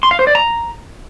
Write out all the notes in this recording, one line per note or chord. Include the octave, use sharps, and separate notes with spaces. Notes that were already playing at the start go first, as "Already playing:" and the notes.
C6
F5
C5
D5
A#5